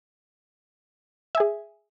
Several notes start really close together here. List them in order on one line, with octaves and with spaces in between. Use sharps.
E5 G#5 G#4